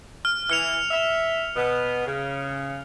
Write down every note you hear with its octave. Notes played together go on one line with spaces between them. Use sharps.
F6
E3 F6 C#7 F7
E5
B2 B3
C#3